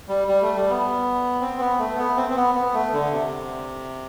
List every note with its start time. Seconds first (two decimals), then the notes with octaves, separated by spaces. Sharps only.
0.08 G3
0.28 G3
0.42 A3
0.56 G3
0.70 B3
1.41 C4
1.60 B3
1.79 A3
1.98 B3
2.17 C4
2.30 C4
2.36 B3
2.55 B3
2.74 A3
2.93 D3
3.11 C3